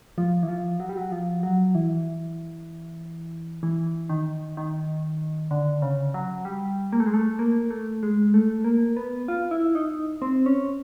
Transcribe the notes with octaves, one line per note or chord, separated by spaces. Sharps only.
F3
E3
F3
F#3
G3
F#3
F3
F#3
E3
E3
D#3
D#3
D3
C#3
F#3
G3
A#3
A3
G#3
A3
A#3
A3
G#3
A3
A#3
B3
F4
E4
D#4
C4
C#4